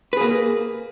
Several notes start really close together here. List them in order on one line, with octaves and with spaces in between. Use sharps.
B4 G#4 A#3